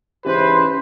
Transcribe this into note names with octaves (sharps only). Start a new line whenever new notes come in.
G#2 C#3 E3 C#4 G4 B4 C5